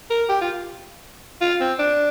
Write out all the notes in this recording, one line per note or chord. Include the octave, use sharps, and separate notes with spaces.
A#4
G4
F4
F4
C4
D4